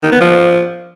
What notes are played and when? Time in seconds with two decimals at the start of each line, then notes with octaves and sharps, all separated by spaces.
0.03 D#3
0.12 B3
0.21 F3